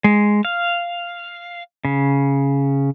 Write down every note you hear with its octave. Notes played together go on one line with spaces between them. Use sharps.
G#3
F5
C#3